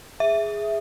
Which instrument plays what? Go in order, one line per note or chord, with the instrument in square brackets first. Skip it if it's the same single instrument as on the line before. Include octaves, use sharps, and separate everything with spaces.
[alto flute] G#4 [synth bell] E5